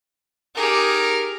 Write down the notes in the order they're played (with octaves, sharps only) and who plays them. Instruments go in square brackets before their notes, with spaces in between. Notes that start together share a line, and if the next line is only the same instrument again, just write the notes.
[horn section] D#4 A#4 [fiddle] G4 G#4